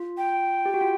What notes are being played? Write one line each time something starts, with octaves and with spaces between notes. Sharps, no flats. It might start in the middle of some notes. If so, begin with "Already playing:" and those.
Already playing: F4
G5
G4
F#4
F4